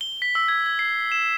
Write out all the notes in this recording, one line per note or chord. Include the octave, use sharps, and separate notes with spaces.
G7
B6
E6
G#6
G#6
C7
E7